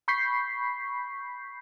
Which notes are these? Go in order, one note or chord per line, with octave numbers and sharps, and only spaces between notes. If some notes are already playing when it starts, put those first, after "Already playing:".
B5 C#6 G6 B6 C7